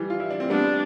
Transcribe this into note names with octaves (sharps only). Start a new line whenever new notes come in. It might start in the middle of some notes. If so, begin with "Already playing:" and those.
Already playing: E3 F3 G3
F4
E4
D4
C4
G3 B3 D4